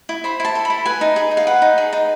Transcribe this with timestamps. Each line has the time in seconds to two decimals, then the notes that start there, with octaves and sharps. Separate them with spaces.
0.09 E4
0.24 C5 B5
0.40 E4 A5
0.55 A4
0.65 B5
0.70 E4
0.86 B4 G#5
1.01 D#4
1.16 G#4
1.31 D#4
1.37 F5
1.47 B4 F#5
1.62 D#4
1.78 G#4
1.93 D#4